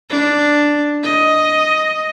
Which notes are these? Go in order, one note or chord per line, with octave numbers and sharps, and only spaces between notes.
D4
D#5